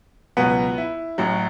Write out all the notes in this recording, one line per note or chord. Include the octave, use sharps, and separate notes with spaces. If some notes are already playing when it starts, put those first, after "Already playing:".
C#2 B2 F#3 B3 B4
E4
A1 A2 F#3